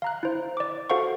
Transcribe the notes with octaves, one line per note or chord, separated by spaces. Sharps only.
F5 A#5 F#6
E4 C5
D5 D6
F#4 A4 C5 F5 F#5 C#6